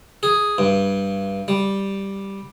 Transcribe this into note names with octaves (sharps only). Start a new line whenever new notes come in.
G#4
G2
G3